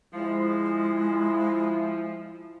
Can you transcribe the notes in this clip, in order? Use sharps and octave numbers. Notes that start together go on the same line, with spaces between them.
F3 G#3 E4